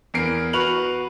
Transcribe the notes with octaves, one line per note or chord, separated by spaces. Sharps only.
E2 A#4 C7 D7
F#4 B4 C#6 F7 F#7